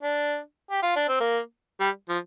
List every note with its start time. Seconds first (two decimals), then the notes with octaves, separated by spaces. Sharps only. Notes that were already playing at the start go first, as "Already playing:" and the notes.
0.03 D4
0.71 G4
0.83 F4
0.96 D4
1.09 C4
1.21 A#3
1.80 G3
2.09 F3